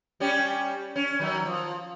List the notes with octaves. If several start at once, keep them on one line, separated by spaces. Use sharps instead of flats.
G3 C#4 G4
C#4
D#3 F#3
F3